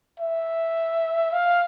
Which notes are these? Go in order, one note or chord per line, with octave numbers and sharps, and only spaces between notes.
E5
F5